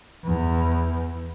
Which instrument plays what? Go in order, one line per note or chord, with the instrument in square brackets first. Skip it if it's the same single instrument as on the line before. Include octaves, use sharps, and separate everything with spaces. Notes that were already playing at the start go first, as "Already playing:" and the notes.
[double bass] E2